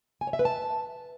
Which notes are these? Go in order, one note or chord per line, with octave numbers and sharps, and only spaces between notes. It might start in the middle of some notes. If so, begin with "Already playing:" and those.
G#5
C#5
E5
B4
A5